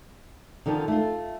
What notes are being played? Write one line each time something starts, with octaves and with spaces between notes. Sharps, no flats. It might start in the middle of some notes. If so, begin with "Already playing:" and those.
D3 D#3 F3
A3 F4